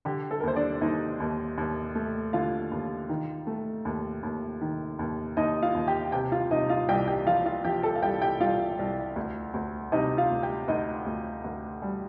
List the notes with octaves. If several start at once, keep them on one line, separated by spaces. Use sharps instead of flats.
D3 G4
A4
A#4
D#2 C5
D4 D5
D#2 D#4 D#5
D#2
D#2
A3
D3 F4 F5
D#2
D#3
A3
D#2
D#2
D#3
D#2
D#2 D#4 D#5
F4 F5
D#2
G4 G5
C3 G4 G5
F4 F5
C3 D#4 D#5
F4 F5
C2 G4 G5
G4 G5
F3 F4 F5
F4 F5
F3 G4 G5
A4 A5
F5
C2 G4 G5
G4 G5
C2 F4 F5
C2
D2
D2
C3 D#4 D#5
F4 F5
D2
G4 G5
D2 D#4 D#5
D2
D2
G3